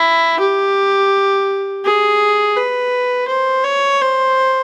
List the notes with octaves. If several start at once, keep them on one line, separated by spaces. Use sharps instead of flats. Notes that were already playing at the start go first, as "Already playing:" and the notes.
Already playing: E4
G4
G#4
B4
C5
C#5
C5